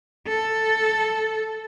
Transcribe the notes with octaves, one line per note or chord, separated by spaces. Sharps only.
A4